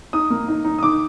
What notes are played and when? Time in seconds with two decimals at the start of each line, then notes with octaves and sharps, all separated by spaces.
0.13 D#4 D#6
0.30 A#3
0.48 D#4
0.64 D#4
0.79 D#6
0.83 D#3 D6